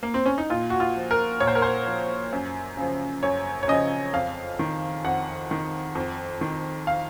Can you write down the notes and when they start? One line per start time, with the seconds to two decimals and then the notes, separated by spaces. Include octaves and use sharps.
0.03 A#3
0.14 C4
0.26 C#4
0.38 D#4
0.50 A#2 F4
0.70 F#4
0.80 F4
0.96 F3
1.11 A#4
1.40 A#2 C#5
1.47 C5
1.55 A#4
1.62 C5
1.87 F3
2.33 F#2
2.77 C#3 F3
3.23 F#2 C#5
3.63 C#5
3.68 C#3 F3 D#5
4.13 F2 F5
4.59 D#3
5.04 F2 F#5
5.51 D#3
5.95 F2
6.41 D#3
6.87 F5